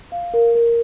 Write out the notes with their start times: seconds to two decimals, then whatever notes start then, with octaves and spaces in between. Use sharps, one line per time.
0.12 F5
0.34 A#4
0.55 A#4